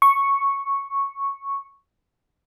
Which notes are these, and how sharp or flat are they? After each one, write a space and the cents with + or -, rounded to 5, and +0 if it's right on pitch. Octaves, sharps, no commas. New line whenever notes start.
C#6 -5